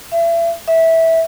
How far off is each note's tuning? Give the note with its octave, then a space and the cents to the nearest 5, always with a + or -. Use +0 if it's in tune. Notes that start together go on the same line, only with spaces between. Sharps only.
E5 +35
E5 -15